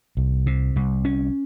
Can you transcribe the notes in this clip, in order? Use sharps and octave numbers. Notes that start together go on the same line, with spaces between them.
C2
C3
C2
C#4